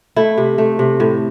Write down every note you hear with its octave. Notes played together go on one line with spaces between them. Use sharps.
A3 E4
C3
A3
C3
A2